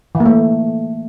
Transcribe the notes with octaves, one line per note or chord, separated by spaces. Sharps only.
E3
A#3
A3